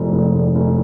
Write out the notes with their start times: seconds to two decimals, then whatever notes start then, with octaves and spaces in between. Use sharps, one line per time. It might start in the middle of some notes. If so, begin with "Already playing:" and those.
Already playing: F1 F2
0.13 F1
0.34 F1
0.55 F1